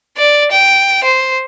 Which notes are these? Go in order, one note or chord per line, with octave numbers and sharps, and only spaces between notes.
D5
G5
C5